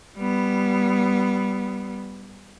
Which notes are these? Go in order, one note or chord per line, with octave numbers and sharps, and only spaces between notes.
G3 B3